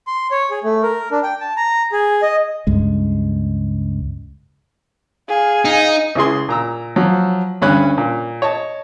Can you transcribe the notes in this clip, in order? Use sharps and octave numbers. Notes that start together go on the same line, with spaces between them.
C6
C#5
G#4
A3
A#4
D4
G5
A5
A#5
G#4
D#5
C#2 G2 G#3
G#4 F5
D#4
C#2 E4 G#4 C6
A#2 A#5 E6
F3 F#3
D2 G2 C#4 B5 F#6
A#2
C#5 D#5 A5